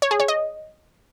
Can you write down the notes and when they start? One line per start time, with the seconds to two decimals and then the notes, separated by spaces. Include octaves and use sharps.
0.02 C#5
0.11 G#4
0.20 C#5
0.28 D#5